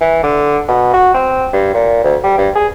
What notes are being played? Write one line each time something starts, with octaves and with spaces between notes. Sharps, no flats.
E3
D3
B2
F#4
C4
G2
A#2
D2
G3
G2
G#4